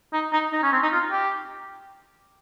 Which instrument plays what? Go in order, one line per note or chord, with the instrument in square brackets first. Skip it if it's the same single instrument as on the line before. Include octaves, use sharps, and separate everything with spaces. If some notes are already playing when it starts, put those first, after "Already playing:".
[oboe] D#4
D#4
D#4
C#4
C4
D#4
F4
G4